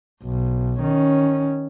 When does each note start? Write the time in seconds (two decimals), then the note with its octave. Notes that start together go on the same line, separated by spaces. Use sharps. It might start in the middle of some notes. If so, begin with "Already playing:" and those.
0.23 B1
0.80 D#3 C#4